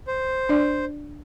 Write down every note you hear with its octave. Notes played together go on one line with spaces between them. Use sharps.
C5
D4 D5